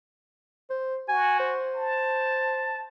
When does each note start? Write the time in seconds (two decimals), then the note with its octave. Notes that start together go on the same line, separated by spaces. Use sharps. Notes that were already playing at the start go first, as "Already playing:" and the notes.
0.70 C5
1.09 F#4 G#5
1.40 C5
1.76 A5